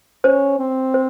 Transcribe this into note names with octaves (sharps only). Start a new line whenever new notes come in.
C#4 C5
C4
C5